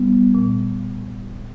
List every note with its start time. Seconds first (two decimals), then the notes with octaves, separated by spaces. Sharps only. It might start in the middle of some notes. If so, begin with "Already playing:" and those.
Already playing: G3 B3
0.35 A#2